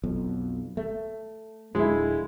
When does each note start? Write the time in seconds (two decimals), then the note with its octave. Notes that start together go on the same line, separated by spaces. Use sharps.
0.04 B1 F2
0.77 A3
1.75 D1 D2 F3 G#3 E4